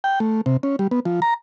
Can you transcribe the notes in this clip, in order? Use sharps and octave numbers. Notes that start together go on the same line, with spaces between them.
G5
A3
C3
C#4
G3
B3
F3
A#5